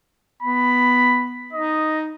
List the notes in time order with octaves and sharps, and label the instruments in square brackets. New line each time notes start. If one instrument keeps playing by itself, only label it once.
[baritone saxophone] B3 [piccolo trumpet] B5
[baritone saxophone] D#4 [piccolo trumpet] D#5